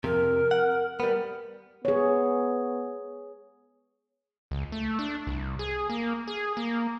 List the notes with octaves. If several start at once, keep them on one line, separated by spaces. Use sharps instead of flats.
F2 C3 A#4
F#5
G3 B3 A#4
B3 G#4 C#5
C#2
A3
D4
C2
G#4
A#3
G#4
A#3